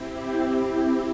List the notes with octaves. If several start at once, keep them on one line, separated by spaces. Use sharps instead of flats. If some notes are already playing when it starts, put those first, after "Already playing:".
Already playing: C4 E4 G4